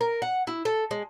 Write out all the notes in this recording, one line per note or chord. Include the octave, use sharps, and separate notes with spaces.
A#4
F#5
E4
A4
G#3